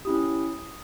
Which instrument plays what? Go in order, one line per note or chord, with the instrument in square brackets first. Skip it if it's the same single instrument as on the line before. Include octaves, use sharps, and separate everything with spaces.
[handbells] C#4 E4 G4 D#6